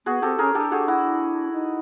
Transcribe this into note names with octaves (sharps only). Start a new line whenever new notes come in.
B3 F#4 G#4
C4 G4 A4
C#4 G#4 A#4
D4 G4 A4
F#4 G#4
E4 F#4
D#4